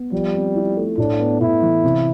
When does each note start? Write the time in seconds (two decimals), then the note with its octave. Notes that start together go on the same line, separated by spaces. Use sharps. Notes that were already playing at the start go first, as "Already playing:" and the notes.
Already playing: B3
0.12 F3 G3
0.34 C4
0.55 E4
0.77 A3
0.98 A2 D4
1.19 B3
1.41 A2 E4
1.62 E3
1.84 C3